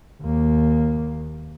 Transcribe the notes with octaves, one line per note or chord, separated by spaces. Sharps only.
D#2 A#3